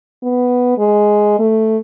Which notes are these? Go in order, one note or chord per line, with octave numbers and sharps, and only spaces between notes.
B3
G#3
A3